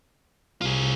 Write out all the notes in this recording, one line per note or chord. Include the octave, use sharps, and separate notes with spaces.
C2 F4 G#4